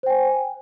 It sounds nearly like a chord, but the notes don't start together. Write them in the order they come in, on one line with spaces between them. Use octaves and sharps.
C5 G5 G#5